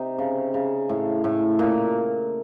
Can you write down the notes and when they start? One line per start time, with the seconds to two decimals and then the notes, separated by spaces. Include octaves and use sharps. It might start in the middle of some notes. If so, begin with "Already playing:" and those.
Already playing: C3 D#4
0.18 C#3
0.54 C#3
0.89 A2
1.24 A2
1.59 A#2